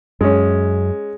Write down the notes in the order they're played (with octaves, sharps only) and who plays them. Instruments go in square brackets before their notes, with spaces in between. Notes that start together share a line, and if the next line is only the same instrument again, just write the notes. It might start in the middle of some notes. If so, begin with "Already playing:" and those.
[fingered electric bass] F#2 [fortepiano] G#3 C#4